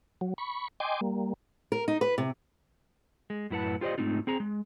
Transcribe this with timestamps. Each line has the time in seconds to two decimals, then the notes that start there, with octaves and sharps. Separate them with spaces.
0.21 F#3
0.38 B5 C#6
0.80 D#5 G5 G#5 C6 D6
1.01 G3 A#3
1.72 A#4
1.88 D#4
2.01 B4
2.18 C3
3.30 G#3
3.50 F#2 A2 E4 B4 F#5 A5
3.81 F4 G4 C5 D5 D#5
3.98 G#2 D#3 A3 C4 D#4 F4
4.27 C4 G#4 A#5
4.40 G#3